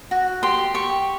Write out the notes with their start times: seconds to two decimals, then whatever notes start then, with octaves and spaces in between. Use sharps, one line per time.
0.11 F#4
0.43 G4 C6
0.74 G4 C#6